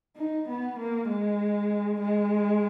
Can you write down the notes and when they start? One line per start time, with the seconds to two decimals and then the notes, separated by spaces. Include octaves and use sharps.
0.17 D#4
0.49 B3
0.79 A#3
1.09 G#3
2.01 G#3